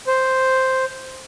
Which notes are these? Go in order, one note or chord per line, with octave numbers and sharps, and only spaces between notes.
C5